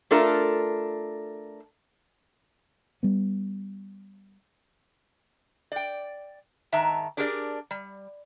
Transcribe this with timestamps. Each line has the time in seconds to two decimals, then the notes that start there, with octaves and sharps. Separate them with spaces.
0.11 A3 D4 F4 A4 A#4
3.03 G3 B3
5.72 D5 G5
6.72 G#2 D#3 E5 A5 A#5
7.17 D4 G4 G#4 A#4 C5 D5
7.71 G3